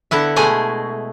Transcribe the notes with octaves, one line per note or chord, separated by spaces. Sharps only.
D3 B3 E4 E5
B2 G#3 A3 G#4 G#5 A#5